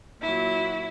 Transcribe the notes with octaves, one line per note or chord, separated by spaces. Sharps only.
A#2 F#3 E4